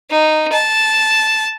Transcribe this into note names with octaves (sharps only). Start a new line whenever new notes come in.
D#4
A5